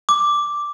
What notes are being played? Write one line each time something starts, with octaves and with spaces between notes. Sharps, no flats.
D6